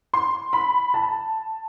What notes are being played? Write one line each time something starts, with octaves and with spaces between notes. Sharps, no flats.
C6
B5
A5